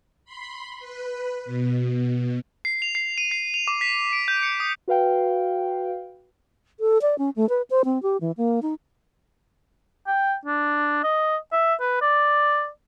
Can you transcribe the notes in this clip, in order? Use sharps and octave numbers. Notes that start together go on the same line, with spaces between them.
B5 C6
B4
B2
C7
F7
C7
D#7
C7
F7
D6
B6
D7
G6
C#7
D#6
F#4 B4 F5 G5
A4
D5
C#4
A3
B4
C5
C4
G4
E3
A#3
D#4
G5
D4
D#5
E5
B4
D5